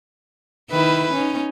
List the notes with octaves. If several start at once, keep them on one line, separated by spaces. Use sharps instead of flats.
D#3 E4 B4
C#4 D#4